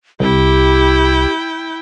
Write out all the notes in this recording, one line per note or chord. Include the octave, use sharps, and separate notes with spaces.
C2 E4 G4 G5